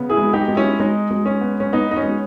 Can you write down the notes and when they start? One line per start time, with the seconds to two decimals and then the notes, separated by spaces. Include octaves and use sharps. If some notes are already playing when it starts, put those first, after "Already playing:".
Already playing: C#3 B3
0.10 E4 G#4
0.17 G#3
0.33 D#4 G4
0.48 G#3
0.56 C#4 E4
0.80 G#3 D#4
1.11 G#3
1.26 C#4
1.41 B3
1.60 C#4
1.73 B3 D#4
1.91 D#4
1.96 C#4
2.03 G#3